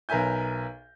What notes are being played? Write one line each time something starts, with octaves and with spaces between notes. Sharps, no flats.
B1 A#4 B4 E5 G#5 G6